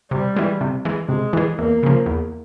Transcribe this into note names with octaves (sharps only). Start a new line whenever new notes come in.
C3 G3
E3 G#3
C3
E3 G#3
C3 G#3
E3 G#3
E2 A#3
C#3 F3
E2